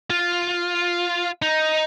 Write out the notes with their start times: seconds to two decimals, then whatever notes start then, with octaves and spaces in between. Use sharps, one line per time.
0.10 F4
1.42 D#4